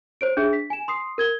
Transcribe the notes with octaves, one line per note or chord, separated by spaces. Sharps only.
C5 C#5 D7
D4 G#4 E5
B6
G#5 E7
C6 D#6 C7
A#4 G#6 G7